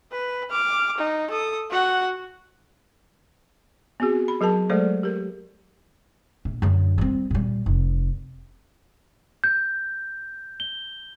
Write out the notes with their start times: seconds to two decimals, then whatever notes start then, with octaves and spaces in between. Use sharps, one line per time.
0.12 B4
0.51 D6 F6
0.98 D#4
1.31 A4 D#6
1.71 F#4 F#5
4.00 B3 C4 F#4 G#4
4.28 B5
4.41 F#3 G#4 A#4 A5
4.70 F#3 G#3 A3 A4 C5 D5
5.03 G4 A#4
6.45 A#1
6.62 F#2 D3
6.98 G3 C4
7.31 A#2 G3
7.66 F1
9.44 G6
10.60 G7